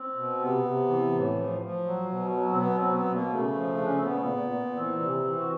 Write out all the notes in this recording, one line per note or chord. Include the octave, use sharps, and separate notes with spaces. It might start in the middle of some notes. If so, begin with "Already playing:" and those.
Already playing: C4
B2
C3 B3
C3
E3
A2
F3
F3
F#3
B2
F#3
C4
B2 B3
C4
F#3
B3
B2
A#3
C#3 A3
F3
C#3 D4
C#4
C4
A#2 B3
A#2
A#2
E3 C4
C3
E3
F#4